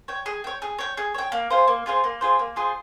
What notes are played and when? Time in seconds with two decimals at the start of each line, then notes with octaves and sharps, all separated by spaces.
0.08 C#5 G5
0.26 G#4
0.44 C#5 G5
0.62 G#4
0.79 C#5 G5
0.97 G#4
1.14 C#5 G5
1.32 A#3
1.50 F4 G#4 C5
1.68 A#3
1.86 F4 G#4 C5
2.04 A#3
2.21 F4 G#4 C5
2.39 A#3
2.56 F4 G#4 C5